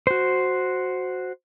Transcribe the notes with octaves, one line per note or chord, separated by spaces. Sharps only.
F#4 C5